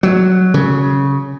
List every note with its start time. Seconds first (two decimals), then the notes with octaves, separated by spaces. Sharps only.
0.03 F#3
0.54 C#3